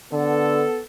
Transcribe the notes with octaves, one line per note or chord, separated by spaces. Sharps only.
D3 B3 A4